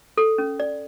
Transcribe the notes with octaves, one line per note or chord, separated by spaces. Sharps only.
A4
C#4
D5